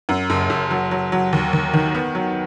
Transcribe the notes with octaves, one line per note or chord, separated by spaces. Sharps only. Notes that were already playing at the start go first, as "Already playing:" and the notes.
F#2
F#1
F#1
F#3
F#3
F#3
D#2
D#2
D#3
B3
F#3